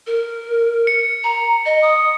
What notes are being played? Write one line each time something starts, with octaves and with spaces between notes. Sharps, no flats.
A#4
C#7
A#5
D#5
D#6